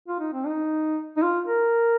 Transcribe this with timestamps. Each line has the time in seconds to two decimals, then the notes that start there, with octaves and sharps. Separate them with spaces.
0.08 F4
0.20 D#4
0.33 C4
0.45 D#4
1.17 D#4
1.22 F4
1.47 A#4